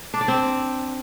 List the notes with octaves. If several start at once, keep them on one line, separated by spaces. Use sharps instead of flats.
D4
D5
C4